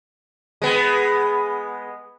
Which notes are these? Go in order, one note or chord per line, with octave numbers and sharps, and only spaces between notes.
G#3 B3